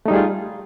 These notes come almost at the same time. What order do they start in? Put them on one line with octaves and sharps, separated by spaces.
A3 D#4 G3 G#4 F4